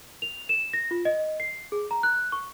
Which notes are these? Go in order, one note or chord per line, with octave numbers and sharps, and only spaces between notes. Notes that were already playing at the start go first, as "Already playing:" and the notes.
F7
E7
A#6
F4
D#5
C7
G#4
A#5
F#6
C#6